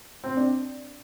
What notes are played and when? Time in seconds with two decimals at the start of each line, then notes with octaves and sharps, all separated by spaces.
0.24 C4
0.37 D4